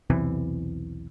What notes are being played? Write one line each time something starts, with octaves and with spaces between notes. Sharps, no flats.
B1 E2 C3 E3